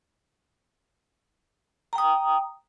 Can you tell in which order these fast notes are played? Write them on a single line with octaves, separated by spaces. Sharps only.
A#5 G5 D#6